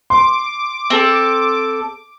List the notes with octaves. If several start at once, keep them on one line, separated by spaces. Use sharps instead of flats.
C6 D6
C4 A4